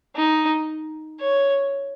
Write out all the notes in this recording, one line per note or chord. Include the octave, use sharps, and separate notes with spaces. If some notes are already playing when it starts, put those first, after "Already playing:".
D#4
C#5